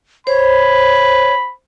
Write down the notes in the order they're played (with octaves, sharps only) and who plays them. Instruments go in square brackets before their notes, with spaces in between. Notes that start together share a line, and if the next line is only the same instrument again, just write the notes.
[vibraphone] C5 [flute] C#5 [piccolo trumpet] B5